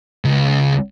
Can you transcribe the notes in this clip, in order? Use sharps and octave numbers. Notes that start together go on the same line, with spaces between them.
C#2